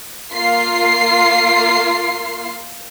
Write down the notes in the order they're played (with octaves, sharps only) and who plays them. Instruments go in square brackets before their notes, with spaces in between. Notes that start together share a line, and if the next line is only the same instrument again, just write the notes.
[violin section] A#3 F4 C7